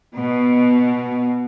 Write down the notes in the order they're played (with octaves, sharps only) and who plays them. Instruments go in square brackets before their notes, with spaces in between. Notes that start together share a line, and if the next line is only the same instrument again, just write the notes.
[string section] B2